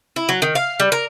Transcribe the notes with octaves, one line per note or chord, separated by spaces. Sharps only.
E4
F#3
D#3
F5
G3
A#4